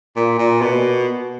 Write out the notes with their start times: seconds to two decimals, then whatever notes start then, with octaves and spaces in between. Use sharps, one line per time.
0.16 A#2
0.38 A#2
0.61 B2